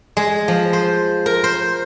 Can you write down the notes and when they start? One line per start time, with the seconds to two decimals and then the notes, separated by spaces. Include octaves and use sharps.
0.17 G#3
0.48 F3
0.73 C5
1.26 A#4
1.44 C5